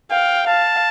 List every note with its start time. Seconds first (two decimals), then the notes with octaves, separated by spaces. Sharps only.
0.11 F5 G5
0.47 F5 A5